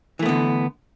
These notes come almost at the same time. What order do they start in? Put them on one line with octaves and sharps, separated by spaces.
E3 A3 B3 D3